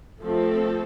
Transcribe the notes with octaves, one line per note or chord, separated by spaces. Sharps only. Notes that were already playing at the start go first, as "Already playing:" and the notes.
F3 A3 C4 A4